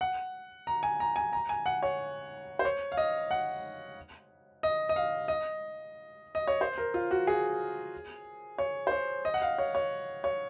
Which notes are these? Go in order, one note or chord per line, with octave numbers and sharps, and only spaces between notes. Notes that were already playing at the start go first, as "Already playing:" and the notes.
F#5
A#5
G#5
A#5
G#5
A#5
G#5
F#5
C#5
C5
C#5
F5
D#5
F#5
D#5
D#5
F5
D#5
D#5
C#5
C5
A#4
F4
F#4
G#4
C#5
C5
C#5
D#5
F#5
F5
C#5
C#5
C#5